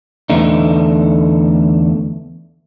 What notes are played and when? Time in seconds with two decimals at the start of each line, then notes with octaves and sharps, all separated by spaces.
0.30 E2 D3 A3 D#4